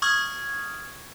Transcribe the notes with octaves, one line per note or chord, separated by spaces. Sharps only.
C#6 D#6 F6 G#6